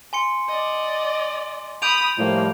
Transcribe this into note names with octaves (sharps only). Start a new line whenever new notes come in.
G#5 C6 C#7
D5 D#5
B5 D#6 G6 D7 F7
A2 F3 G3 A#3